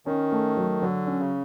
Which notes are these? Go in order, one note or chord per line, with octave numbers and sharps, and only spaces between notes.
D#3 C#4
A3
F#3
D3 F#3
C#4
C#3